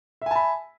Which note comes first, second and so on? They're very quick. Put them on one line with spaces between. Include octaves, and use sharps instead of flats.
E5 G#5 A5 B5